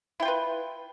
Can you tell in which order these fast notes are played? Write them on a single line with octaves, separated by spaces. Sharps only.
E4 G5 F4 B4